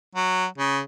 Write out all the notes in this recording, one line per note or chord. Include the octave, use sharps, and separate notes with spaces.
F#3
C#3